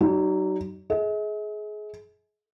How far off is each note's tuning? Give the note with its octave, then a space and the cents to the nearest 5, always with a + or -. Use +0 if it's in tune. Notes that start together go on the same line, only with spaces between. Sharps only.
F#3 +40 D#4 -15
G#4 +25 D#5 +45